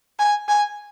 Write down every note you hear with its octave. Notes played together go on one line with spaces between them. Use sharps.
G#5
G#5